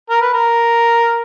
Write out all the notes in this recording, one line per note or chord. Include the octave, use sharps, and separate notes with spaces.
A#4
B4
A#4